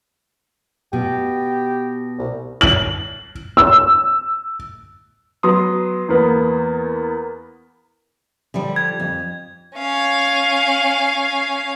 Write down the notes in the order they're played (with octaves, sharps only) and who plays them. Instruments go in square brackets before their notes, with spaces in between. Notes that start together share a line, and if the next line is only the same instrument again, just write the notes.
[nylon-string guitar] B2 [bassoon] G4
[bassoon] C2
[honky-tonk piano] F#7
E6
[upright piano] F#3 B3 C6 D#6
E2 A#3 B3
[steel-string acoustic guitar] D3 F3 G3
[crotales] G#6
[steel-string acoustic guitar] F2
[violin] C#4 F5